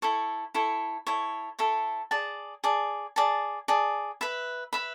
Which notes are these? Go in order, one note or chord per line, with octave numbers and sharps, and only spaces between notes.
E4 A4 C#5
E4 A4 C#5
E4 A4 C#5
E4 A4 C#5
G#4 D5 A5
G#4 D5 A5
G#4 D5 A5
G#4 D5 A5
B4 E5 B5
B4 E5 B5